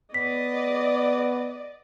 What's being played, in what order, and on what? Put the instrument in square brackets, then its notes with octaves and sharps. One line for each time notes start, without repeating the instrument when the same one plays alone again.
[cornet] B3 [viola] D5 D#5 [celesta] B6